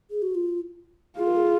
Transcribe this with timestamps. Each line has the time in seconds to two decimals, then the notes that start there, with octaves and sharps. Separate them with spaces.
0.11 G#4
0.22 F#4
0.35 F4
1.17 F4 G#4
1.27 A#4
1.36 G#4